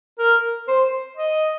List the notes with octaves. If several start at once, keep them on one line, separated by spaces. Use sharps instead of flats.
A#4
C5
D#5